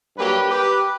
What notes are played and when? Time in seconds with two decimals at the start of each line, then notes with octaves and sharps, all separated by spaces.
0.16 G2 F#3 A#3 G4 B4
0.49 G4 B4